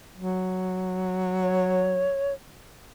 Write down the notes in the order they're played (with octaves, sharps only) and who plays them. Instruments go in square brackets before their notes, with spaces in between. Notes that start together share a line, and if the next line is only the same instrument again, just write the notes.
[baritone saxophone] F#3
[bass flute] C#5